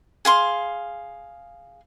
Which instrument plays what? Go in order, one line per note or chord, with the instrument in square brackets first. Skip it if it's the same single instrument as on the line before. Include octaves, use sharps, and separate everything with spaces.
[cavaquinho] G#4 F5 C6